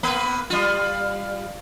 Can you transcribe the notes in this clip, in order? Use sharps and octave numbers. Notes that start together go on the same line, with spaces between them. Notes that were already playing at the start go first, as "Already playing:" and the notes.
A#3 B3 B4
G3 F4